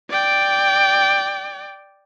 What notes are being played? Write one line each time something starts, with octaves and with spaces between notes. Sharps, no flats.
D5 G5